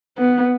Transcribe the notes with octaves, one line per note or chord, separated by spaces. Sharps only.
B3